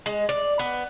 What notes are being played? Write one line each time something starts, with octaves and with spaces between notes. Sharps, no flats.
G#3
D5
B3